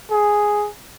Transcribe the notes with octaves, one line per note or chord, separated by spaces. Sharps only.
G#4